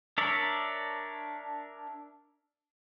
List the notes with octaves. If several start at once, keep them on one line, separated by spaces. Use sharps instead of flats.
D4 A#4 C#5 D5 E5